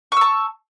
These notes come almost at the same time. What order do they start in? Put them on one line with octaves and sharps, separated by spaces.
C#6 E6 A5